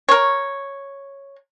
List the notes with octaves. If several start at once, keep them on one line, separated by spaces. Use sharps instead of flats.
A#4 C#5